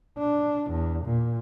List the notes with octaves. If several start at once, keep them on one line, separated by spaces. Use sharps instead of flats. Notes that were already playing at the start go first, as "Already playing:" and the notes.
D4
E2
A#2